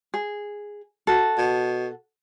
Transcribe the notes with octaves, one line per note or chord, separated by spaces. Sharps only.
G#4
F#4 A4
B2